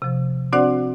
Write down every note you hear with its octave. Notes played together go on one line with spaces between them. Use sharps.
C3 F3
C4 D4 F#4 C5 D5 F#5